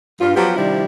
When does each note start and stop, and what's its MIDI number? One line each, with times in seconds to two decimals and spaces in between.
0.21 0.33 43
0.21 0.33 65
0.36 0.53 53
0.36 0.53 54
0.36 0.53 59
0.36 0.53 65
0.36 0.53 67
0.56 0.85 48
0.56 0.85 51
0.56 0.85 53
0.56 0.85 55
0.56 0.85 62
0.56 0.85 64